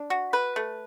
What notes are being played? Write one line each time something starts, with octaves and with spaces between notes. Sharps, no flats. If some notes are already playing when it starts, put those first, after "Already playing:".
Already playing: D4
F#4
B4
A3